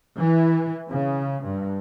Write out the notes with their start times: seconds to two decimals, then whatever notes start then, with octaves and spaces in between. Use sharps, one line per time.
0.18 E3
0.90 C#3
1.42 G2